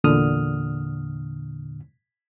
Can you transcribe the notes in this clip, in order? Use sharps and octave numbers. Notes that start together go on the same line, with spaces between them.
E2 A#2 D3 D#6 F6